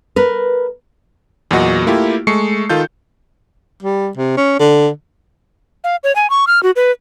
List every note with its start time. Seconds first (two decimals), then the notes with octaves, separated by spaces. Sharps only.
0.16 A#4 B4
1.51 E2 A#2 F#3 F#4 D#5 C#6
1.86 A3 A#3 E4 F4 G4
2.27 G#3 A3 C#6 C7 C#7
2.69 D#3 F4 A4 G6
3.83 G3
4.17 C3
4.37 C#4
4.59 D3
5.84 F5
6.04 C#5
6.16 G#5
6.30 C#6
6.47 F6
6.63 F#4
6.76 B4